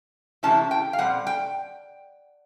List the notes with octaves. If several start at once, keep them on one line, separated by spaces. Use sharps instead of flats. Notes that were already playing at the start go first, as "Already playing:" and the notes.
C3 E3 G#3 C#4 E4 A5
G5
F5
A#2 G3 C4 F#5
G5